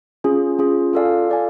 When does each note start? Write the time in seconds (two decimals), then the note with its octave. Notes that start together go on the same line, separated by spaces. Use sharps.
0.24 C#4 F4 G#4
0.59 C#4 F4 G#4
0.93 F4 A4 D5 F5 G#5
1.29 F4 A4 D5 F5 G#5